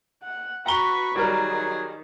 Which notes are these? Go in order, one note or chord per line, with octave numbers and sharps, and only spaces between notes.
F#5
F#4 B4 F#5 A#5 B5 C#6 G7
D#3 F#3 G3 G#4 A#4